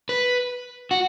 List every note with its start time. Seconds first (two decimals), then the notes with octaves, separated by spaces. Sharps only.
0.09 B4
0.91 F#4